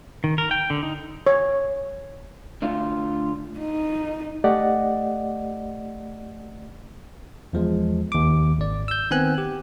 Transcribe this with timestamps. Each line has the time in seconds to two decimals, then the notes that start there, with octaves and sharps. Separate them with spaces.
0.24 D#3
0.38 A#4
0.51 G5
0.70 D3
0.83 D#4
1.27 C#5
2.62 D3 A3 F4
3.60 D#4
4.44 A3 G4 D5 D#5 F#5
7.53 E2 F3 G#3
8.12 D#2 D6
8.58 G#1 D5
8.88 E6 G6
9.11 D#3 B3 C4 G#5 F#6
9.38 G4